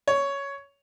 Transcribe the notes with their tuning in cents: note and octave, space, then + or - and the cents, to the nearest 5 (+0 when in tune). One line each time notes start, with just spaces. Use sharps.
C#5 +10